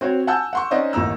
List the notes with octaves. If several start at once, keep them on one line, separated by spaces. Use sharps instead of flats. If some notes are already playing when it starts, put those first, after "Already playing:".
C4 F#4 C5 C#5
F#5 G#5 A5 E6 G6
F#5 C6 C#6
C#4 D#4 C5 D5 D#5 F#5
A1 D#2 D#4 A#5 E6